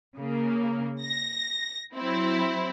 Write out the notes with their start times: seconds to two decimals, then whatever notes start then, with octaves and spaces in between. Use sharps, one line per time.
0.16 C#3 A#3
1.02 A#6
1.95 F#3 C4 E4